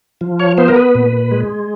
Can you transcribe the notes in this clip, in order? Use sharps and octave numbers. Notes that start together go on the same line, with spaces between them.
F3
C#5
B3 C5
A#4
B4
A#2
G#3